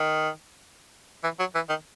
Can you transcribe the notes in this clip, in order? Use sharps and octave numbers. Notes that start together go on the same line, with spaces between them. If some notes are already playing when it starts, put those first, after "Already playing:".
Already playing: D#3
E3
F#3
E3
D#3